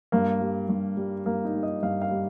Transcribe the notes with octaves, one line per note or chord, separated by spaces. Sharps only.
G2 A#3
G3
G2
G3
G2 A#3
D#4
G3
D#5
G2 F5
F5
G3